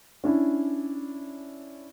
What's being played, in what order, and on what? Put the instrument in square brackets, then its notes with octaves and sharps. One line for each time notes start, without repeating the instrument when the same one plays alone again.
[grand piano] C#4 D4 E4